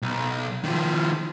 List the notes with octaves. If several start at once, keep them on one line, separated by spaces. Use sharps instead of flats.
B1
D#3 F3